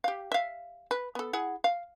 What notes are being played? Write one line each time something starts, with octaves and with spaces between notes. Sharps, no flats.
G4 F5
E5 F5
B4
B3 A4
E4 G#4 F#5
F5